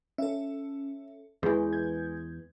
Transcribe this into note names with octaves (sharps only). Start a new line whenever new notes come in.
C#4 A4 E5
E2 E3 G#3 G6
G6 G#6